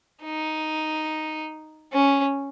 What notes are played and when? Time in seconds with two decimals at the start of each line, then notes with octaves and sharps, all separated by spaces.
0.23 D#4
1.93 C#4